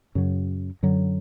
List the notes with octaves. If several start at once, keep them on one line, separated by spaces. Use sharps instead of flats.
F#2 C#3 F#3
F#2 D3 F#3